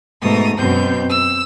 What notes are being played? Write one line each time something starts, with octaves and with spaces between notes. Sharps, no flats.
G#2 B2 A3 A#5 D#6
F#2 B2 C4 G6
E6